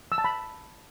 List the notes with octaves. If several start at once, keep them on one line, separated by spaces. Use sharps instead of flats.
E6
A5
B5